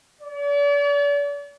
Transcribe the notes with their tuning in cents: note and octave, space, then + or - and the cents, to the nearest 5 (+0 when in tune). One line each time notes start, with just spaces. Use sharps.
D5 -40